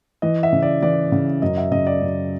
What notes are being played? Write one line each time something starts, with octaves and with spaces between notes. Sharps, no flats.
E3 D#5
E5
C#3
D5
E3 D5
C#3
F#2 D#5
E5
C#3 D#5
D5
F#2